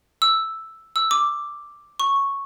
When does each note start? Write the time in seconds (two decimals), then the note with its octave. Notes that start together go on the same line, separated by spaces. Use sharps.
0.22 E6
0.96 E6
1.11 D6
2.00 C#6